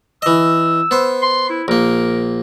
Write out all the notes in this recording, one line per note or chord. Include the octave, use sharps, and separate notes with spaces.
E3 D#5 E6
B3 C5
C6
E4
A#1 A#3 A#4